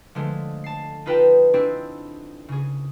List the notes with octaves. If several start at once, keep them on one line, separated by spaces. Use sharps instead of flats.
D3 F3 G#3 A3
A5 C7
D#4 F4 B4 D#5 G5 A5
C4 D4 E4 G#4
C#3 G#4